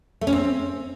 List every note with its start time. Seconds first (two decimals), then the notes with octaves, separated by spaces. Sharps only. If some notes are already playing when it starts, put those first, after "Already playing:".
0.21 A3
0.27 C#4
0.33 C4